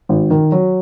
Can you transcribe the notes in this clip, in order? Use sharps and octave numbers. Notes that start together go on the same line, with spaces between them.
G#1
D#3
F#3